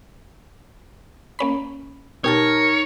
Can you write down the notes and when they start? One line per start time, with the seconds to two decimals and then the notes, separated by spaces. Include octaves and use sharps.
1.39 A#3 C#4 B5
2.24 B2 D#4 G4 A#4 C#5 A5